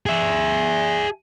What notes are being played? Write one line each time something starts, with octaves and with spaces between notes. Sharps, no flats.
G#4 E5